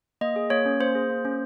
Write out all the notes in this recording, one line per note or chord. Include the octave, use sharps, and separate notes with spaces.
A#3 D#5
G#4
A#3 C#5
C#4
A#3 C5
G#4
A#3
C#4